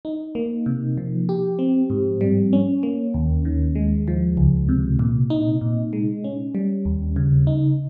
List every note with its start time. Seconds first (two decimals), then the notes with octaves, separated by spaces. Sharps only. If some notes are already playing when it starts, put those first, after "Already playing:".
0.05 D#4
0.35 A#3
0.66 C3
0.98 F3
1.29 G4
1.59 C4
1.90 G#2
2.21 G3
2.53 C#4
2.83 A#3
3.14 D#2
3.45 D#3
3.75 G#3
4.08 F3
4.37 C#2
4.69 C3
4.99 A#2
5.30 D#4
5.61 A#2
5.93 G#3
6.24 C#4
6.55 G3
6.85 D#2
7.16 C#3
7.47 D#4